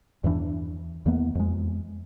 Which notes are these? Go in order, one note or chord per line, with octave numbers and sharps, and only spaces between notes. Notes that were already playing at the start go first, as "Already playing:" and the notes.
E2 G2 E3 D4
E2 E3 A#3 B3
F2 G#3